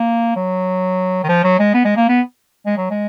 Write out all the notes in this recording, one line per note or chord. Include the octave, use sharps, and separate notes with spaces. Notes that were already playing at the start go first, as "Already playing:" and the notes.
Already playing: A#3
F#3
D#3
F3
F#3
G#3
B3
G#3
A#3
B3
G#3
F#3
G#3